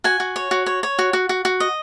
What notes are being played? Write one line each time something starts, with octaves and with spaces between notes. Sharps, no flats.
F#4 G#5
F#4
C#5
F#4
C#5
C#5
F#4
F#4
F#4
F#4
D#5